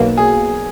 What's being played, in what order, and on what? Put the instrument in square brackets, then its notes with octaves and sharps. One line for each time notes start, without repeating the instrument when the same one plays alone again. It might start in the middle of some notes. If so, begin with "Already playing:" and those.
Already playing: [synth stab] B1 B2 F#3 A#3
[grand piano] G#4